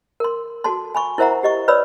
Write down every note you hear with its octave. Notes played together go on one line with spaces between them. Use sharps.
A#4 C6
F#4 A4 A5 C6
G#5 B5 C#6
E4 A#4 C5 E5 F#5 A#5
G4 D#5 C#6
B4 C#5 D5 B5 E6